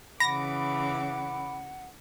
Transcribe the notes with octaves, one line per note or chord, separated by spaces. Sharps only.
C#3 E3 F#5 B5 D6 A#6